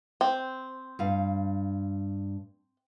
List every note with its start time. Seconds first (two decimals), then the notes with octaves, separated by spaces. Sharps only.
0.21 C4
0.99 G2 F5